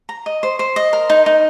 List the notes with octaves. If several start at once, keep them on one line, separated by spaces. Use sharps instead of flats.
A#5
D#5
C5
C5
D#5
A#4
D#4
D#4